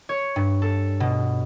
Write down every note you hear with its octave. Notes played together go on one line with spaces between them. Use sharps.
C#5
G2
A4
B2